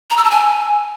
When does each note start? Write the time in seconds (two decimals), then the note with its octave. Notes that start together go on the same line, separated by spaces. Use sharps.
0.10 A#5
0.17 E6
0.24 A5
0.31 G#5